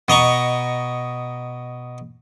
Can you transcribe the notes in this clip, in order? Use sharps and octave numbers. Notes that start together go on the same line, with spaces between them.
B2 D#5 A#5 C#6